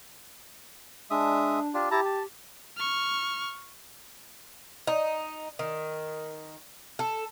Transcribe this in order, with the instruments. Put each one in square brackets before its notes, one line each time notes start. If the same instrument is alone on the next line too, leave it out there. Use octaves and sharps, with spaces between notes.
[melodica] G#3 E5 D#6 [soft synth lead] D4
[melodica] D4 F4 G4
[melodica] E4 A5 A#5 [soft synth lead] G4
[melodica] A5
[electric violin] C#6 F6
[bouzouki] D#4
D#3
A4